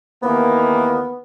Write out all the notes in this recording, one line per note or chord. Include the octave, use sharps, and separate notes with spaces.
D#2 E3 A#3 B3